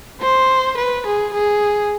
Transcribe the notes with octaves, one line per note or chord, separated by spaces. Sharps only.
C5
B4
G#4
G#4